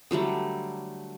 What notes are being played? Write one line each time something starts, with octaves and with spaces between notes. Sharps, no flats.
D3 F#3 G3 A3